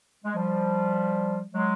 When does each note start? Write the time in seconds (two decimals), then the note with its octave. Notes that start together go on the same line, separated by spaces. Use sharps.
0.25 G#3
0.36 F3 G3
1.53 F#3 G#3